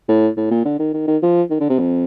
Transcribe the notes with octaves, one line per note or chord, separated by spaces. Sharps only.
A2
A2
A#2
D3
D#3
D#3
D#3
F3
D#3
D3
C3
F2